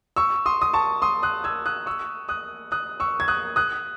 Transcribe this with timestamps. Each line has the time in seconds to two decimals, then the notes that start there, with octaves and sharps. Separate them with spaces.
0.17 C#6 E6
0.46 C6 D#6
0.62 D#6
0.73 A5 C#6
1.02 C6 D#6
1.23 D#6 F#6
1.44 E6 G#6
1.66 D#6 F#6
1.86 C#6 E6
2.29 D#6 F#6
2.72 D#6 F#6
3.00 C#6 E6
3.20 G#6
3.28 D#6 F#6
3.56 D#6 F#6